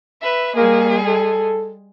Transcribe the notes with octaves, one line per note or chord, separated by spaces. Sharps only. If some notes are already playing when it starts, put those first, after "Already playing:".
B4 E5
G3 G#3 A#3 G#4
A4